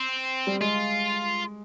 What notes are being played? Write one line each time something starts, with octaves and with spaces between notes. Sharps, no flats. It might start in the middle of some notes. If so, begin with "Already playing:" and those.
Already playing: C4
G3
G#3 F4